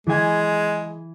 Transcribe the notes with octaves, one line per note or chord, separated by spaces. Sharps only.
E3 G#3 G#5